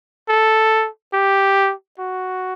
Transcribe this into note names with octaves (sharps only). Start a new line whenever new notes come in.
A4
G4
F#4